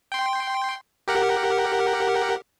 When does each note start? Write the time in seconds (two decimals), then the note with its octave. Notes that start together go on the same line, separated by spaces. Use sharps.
0.12 G5 C6
1.08 G4 A#4 F#5